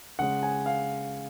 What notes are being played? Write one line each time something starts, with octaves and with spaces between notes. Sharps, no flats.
C#3 G#3 C#4 F#5
G#5
F5